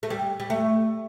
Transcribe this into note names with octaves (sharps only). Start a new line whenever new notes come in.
A3
G3
G3
A3